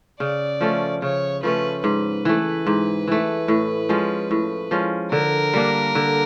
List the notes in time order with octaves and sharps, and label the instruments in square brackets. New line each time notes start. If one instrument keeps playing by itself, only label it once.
[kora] C#3 [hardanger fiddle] D5
[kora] F3 A3 C#4
[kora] C#3 [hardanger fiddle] C#5
[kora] F3 A3 C#4 [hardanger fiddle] B4
[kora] G#2 [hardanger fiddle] B4
[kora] E3 A3
G#2
E3 A3
A2
F3 G#3 C#4
A2
F3 G#3 C#4
[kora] D3 [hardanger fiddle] A#4
[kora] G3 A#3 D4
D3